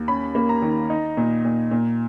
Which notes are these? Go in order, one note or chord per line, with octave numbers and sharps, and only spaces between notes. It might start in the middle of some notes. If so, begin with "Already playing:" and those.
Already playing: D#2
C#4 B5
A#3
A#5
D#3
D#4
A#2
A#2
A#2